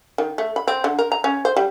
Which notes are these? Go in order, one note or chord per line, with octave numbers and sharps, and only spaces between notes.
D#3
A3
B5
C4
D3
A#4
A#5
C#4
C5
G3